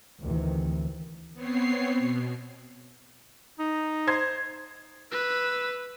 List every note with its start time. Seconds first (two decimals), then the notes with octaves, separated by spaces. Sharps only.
0.22 D2 C3 D#3 E3
1.34 B3 C4 C#5 C7
1.98 B2
3.59 D#4
4.07 C5 G#6 C7
5.11 B4 E6